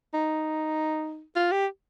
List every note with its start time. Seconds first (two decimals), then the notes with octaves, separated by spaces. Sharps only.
0.14 D#4
1.36 F4
1.51 G4